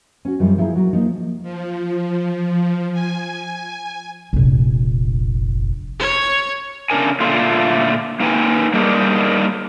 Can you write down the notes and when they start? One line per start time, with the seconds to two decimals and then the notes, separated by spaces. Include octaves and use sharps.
0.25 C#4 F#4
0.39 F#2 D#3 F3 G3 A3
0.58 F3 E4 G#4 A#4
0.75 F#3 F#4 A#4
0.93 F3 A#3 D#4
1.42 F3
2.93 G#5
4.33 F1 A#1
6.00 C#5 G#6
6.90 C#3 D4 A#4 G#5
7.20 A#2 D3 A3 F4
8.20 A#3 D#4 B4 G5 G#5
8.73 G3 A#3 D4 D#4 G#4